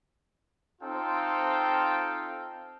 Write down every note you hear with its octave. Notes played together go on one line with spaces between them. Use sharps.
C4 D#4 F4 A4 F5 G5